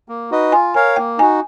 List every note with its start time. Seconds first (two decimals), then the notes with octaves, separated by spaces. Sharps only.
0.09 A#3
0.31 D#4 F#4 B4 D#5
0.52 F4 G#5
0.74 A#4 C#5 F5 G#5
0.96 A#3 G5
1.18 D#4 F#4 G#5